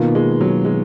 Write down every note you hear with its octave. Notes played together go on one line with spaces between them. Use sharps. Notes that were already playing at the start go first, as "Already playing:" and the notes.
Already playing: B2 D#3 A#3 F4
G#3
F#3
G#3